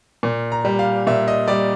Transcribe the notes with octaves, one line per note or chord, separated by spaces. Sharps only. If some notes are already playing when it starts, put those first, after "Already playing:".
A#2
A#5
G3
F5
A#2 E5
D#5
G3 D5